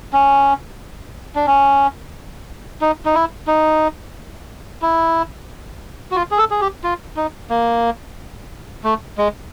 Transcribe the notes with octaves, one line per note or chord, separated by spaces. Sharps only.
C#4
D4
C#4
D#4
D#4
E4
D#4
E4
F#4
F4
G#4
A4
G#4
G4
F4
D#4
A#3
A3
G#3